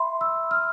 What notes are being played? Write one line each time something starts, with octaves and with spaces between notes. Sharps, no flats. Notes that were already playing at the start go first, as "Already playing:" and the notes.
Already playing: E5 B5 C6
E6
F6